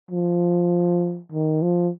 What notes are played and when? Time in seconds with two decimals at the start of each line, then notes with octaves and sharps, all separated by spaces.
0.11 F3
1.32 D#3
1.62 F3